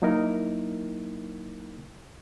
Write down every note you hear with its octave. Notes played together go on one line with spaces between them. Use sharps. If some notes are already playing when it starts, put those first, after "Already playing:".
F#3 A#3 D#4 E4 A#4